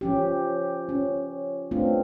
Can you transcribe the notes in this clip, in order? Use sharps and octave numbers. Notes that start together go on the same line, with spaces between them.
F3 C#4 G4
C#4
A3 B3 C4 D4 F4